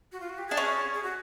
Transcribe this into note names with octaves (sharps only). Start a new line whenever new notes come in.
F#4
F4
F#4
G4
D4 G#4
C#4
G#4
F#4